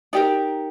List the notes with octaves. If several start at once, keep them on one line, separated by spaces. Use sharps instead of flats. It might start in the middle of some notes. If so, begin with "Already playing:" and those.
D#4 G4 A#4 D5